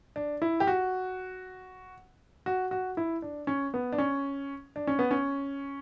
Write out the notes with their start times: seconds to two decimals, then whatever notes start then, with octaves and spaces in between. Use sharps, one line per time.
0.16 D4
0.42 E4
0.60 G4
0.67 F#4
2.46 F#4
2.71 F#4
2.97 E4
3.22 D4
3.47 C#4
3.74 B3
3.93 D4
3.98 C#4
4.76 D4
4.87 C#4
4.99 B3
5.11 C#4